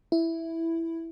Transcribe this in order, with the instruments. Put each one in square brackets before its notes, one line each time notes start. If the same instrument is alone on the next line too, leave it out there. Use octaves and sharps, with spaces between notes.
[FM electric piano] E4